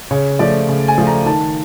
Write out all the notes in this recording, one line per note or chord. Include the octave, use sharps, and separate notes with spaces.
C#3 C#5
F3 A3 D5
C#3
G#5
F3 A3
A#5
D#3 A5